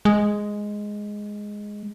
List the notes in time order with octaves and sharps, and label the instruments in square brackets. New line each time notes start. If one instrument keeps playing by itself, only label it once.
[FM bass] G#3